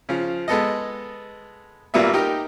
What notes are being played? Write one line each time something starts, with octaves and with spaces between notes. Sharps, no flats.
C#3 F3
G#3 B3 A4 D#5
G#1 A#2 G3 A#3 B3 E5
D#4 G4 A#4